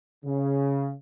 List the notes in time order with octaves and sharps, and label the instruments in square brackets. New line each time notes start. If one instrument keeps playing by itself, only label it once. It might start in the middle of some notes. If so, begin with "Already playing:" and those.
[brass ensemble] C#3